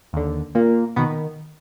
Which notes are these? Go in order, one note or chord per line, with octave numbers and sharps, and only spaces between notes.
D#2 D3
A#2 A#3
B2 D#3 B3